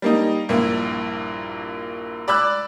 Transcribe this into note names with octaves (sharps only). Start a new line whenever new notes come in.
G3 A#3 D#4
A#1 G2 A#3 E4
D5 B5 D6 E6 F#6